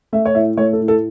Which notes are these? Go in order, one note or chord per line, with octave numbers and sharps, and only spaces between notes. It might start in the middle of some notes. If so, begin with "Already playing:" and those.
A3 E5
C#5
A2 E5
A3 C#5
A4
A2
A4